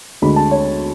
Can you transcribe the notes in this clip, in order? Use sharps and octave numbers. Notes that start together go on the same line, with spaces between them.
D2 D3 G#3 B5
A5
C#5